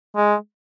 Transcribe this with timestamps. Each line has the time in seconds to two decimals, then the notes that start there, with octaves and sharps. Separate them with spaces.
0.16 G#3